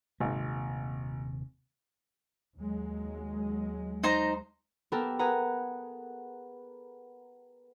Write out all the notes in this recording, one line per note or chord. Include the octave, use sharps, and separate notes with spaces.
D#1 G#1 C3 A#3
D#2 F#3 G#3
D#4 C5 A#5
B3 G4 A4 A#4
G#4 B4 F#5 A#5